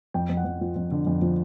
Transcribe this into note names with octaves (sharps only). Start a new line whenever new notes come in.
F2 G5
F2
F#5
F2
F3
F2
D3
F2
F3